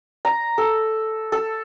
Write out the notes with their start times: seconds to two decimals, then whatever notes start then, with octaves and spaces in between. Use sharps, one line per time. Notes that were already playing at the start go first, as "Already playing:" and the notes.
0.25 A#5
0.58 A4
1.32 A4